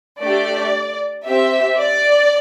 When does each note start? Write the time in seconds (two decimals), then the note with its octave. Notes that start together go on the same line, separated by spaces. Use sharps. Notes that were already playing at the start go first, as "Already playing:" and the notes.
0.22 A3 D4 G4 D5
1.26 C4 G4 E5
1.79 D5